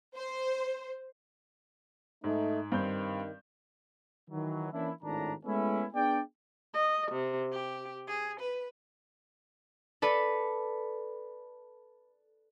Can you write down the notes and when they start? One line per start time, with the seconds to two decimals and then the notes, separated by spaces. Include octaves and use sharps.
0.15 C5
2.24 G#2 A3 D#4
2.72 G2 D#3 C4 G6
4.29 D#3 E3 F#3
4.72 E3 A#3 C#4 D4 E4
5.03 G#1 A2 D#3 D4 A#5
5.45 G#3 A3 B3 C#4 E4
5.93 B3 D4 G#4 D5 G5
6.74 D#5
7.11 C3
7.51 G4
8.06 G#4
8.39 B4
10.02 A4 B4 D5